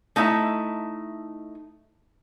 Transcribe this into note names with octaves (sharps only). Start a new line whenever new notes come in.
A3 D#4 E4 E5 A5